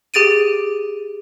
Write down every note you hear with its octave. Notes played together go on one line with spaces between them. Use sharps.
G4 G#4 A6 D7 D#7